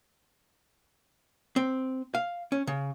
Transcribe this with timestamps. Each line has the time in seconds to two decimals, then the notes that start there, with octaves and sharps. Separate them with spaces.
1.56 C4
2.15 F5
2.52 C#4
2.67 C#3